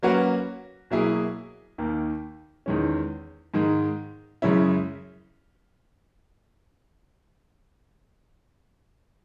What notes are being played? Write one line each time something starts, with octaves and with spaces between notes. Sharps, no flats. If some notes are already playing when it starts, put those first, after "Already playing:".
F#3 A#3 C#4 F#4 B4
B2 F#3 A#3 E4 G#4
D#2 D#3 A#3
E2 D#3 G#3 C#4
G#2 D#3 G#3
F#2 C#3 G#3 C#4 E4